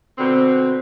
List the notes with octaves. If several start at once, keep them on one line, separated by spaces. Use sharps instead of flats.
B2 D3 C4